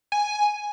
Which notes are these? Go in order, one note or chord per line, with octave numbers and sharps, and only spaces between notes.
G#5